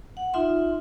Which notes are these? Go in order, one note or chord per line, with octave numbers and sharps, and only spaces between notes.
F#5
D#4 F4 E5 C6